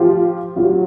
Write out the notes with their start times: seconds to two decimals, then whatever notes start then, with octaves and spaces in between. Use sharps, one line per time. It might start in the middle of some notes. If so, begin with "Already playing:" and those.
Already playing: F3 F4 G4
0.56 F#3 F4 G4